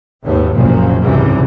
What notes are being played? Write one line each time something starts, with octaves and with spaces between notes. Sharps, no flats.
G#1 D#2 A2 B3
F#1 C2 F#2 A#2 F3
G#1 C#2 F#2 C3 E3 G3